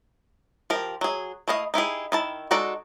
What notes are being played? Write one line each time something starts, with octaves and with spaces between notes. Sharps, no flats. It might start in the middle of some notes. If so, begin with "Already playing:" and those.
F3 G4 A#4
F#3 G#4
A3 E4 D#5 F5
D#4 E4 G4 G#4
D#3 E4 A5
G#3 D#4 F#4 A4 D5